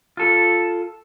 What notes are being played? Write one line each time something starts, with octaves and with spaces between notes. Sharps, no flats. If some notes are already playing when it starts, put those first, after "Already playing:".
F4 A4